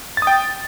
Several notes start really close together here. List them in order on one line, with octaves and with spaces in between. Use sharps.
A6 D#6 G5